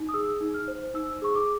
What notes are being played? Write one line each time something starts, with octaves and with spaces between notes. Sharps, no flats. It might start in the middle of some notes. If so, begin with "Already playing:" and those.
Already playing: D#4
D#6
G#4 E6
D#4
F6
C5
D#4 E6
G#4 C#6
D6